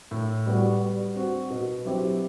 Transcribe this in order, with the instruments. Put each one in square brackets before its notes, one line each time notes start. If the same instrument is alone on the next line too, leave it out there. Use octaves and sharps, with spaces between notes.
[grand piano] A2
G3 B3 F#4
G3
C4 F#4
B2
F#3 C4 E4 G4